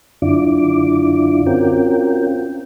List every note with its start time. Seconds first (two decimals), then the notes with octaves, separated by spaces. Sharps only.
0.22 F#2 D3 D4 E4 F4 D6
1.47 C4 C#4 F4 F#4 A#4 G5